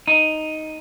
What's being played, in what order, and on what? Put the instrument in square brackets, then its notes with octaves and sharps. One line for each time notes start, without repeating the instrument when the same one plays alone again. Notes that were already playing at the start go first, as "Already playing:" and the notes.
[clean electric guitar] D#4